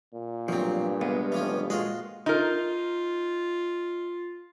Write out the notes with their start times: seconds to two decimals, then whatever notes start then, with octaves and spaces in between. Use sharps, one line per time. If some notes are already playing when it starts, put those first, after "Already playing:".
0.14 A#2
0.48 G2 B2 F3 F#3 A3 C4
1.01 C2 G#3 B3
1.32 F1 E3 F3 C#4
1.70 A#2 G#3 F4 F#4 D#5
2.26 D#4 F4 A#4